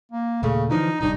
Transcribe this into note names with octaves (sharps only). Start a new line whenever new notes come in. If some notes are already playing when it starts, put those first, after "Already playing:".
A#3
D#2 A#2 C#3 A3
D3 E3 F3 D#4
D1 C2 G2 D#4